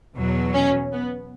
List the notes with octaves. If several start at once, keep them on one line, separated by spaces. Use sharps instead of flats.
E2 B2 F#3
C#4
B3